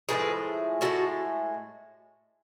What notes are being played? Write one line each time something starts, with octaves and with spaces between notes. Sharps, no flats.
A2 F3 G#3 G#4 B4
A2 G#3 F#4 A4